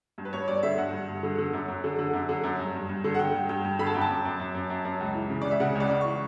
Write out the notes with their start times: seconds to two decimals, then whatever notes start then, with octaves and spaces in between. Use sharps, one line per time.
0.18 G2
0.25 B4
0.33 G2 C#5
0.48 G2 D5
0.63 D3 E5
0.77 G2 F#5
0.93 G2
1.08 G2
1.23 D3
1.38 D3
1.53 F#2
1.68 F#2
1.84 D3
1.99 D3
2.13 F#2
2.29 D3
2.44 F#2
2.59 G2
2.74 G2
2.89 G2
3.04 D3
3.15 F#5
3.19 D3 G5
3.35 G2
3.49 G2 G5
3.64 G2
3.79 D3 B5
3.86 A5
3.94 F#2 G5
4.01 A5
4.09 F#2
4.25 F#2
4.40 F#2
4.55 F#2
4.70 F#2
4.85 F#2
5.00 C#2
5.15 E3
5.30 C#3
5.42 C#2 D5
5.51 E5
5.60 C#3 F#5
5.75 C#2
5.80 D5
5.90 C#2
6.01 E3 C#6